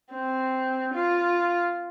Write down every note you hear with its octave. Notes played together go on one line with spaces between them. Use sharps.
C4
F4